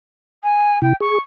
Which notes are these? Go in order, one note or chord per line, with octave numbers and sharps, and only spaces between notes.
G#5
C3 E4 G5
G#4 C#6